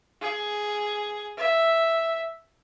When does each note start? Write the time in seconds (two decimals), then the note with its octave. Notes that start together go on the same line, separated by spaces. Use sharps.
0.21 G#4
1.38 E5